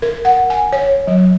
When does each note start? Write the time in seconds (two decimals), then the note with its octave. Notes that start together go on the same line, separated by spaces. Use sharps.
0.02 A#4
0.25 F#5
0.50 G#5
0.73 C#5
1.07 F#3